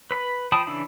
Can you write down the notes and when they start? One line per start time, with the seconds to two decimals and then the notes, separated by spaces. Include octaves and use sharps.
0.11 B4 B5
0.52 F3 G5 A5 B5 D#6
0.67 C#3 E3 D4 E4 B5